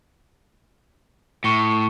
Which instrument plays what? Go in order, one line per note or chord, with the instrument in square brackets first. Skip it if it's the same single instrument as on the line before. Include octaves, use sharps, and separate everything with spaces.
[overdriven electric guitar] A2 [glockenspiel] C#6 C#7 G7